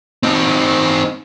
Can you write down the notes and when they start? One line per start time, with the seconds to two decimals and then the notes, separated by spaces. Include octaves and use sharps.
0.23 C4 D#4